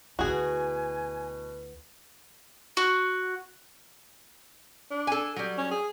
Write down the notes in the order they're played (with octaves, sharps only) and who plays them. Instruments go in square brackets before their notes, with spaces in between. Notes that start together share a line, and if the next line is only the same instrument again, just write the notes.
[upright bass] D2 E4 [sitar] B2 [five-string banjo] F#4 G#4 [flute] G#5
[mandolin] F#4
[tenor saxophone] D4
[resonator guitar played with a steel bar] A4 G#5
F#3 G3
[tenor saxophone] C#4
G#4